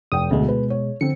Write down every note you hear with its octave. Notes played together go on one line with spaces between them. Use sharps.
F1 G5 D#6
D2 B2 G#3
B4
C#5
D3 C4 C#7